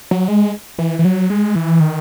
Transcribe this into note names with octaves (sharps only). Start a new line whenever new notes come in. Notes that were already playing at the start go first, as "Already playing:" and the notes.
F#3
G#3
E3
E3
F#3
G#3
E3
D#3